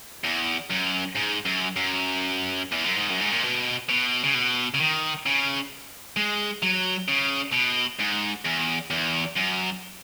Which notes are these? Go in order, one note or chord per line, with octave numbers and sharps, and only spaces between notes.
E2
F#2
G#2
F#2
F#2
E2
F#2
G#2
F#2
G#2
A#2
B2
B2
C#3
B2
C#3
D#3
C#3
G#3
F#3
C#3
B2
G#2
E2
E2
F#2